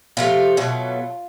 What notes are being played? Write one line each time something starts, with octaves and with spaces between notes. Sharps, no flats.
C3 F3 A3 F4
B2 F#3 A3